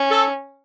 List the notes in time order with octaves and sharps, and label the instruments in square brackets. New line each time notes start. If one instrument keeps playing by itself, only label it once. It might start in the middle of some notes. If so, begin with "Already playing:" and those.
Already playing: [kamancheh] C#4
[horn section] A4